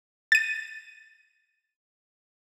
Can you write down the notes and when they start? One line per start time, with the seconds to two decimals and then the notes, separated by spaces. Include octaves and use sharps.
0.32 A6 D#7